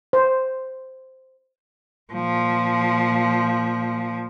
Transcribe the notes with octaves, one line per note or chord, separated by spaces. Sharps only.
C5
A#2 F3